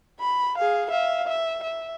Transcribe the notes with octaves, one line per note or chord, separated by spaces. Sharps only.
B5
G#4 F5
E5 F5
E5
E5